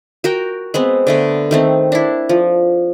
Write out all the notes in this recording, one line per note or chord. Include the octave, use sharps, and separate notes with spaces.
F#4 A#4 G5
G#3 B3 C4
D3 A3 B3
D#3 A3 C4
D4 E4
F3